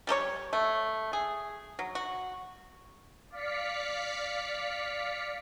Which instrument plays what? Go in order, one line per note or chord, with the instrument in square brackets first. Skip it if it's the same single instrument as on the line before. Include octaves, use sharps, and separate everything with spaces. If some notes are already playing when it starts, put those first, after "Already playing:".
[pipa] G3 G4 A4 C#5
A3
G#4
F#3
F#4
[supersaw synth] D5 F5 B6 C#7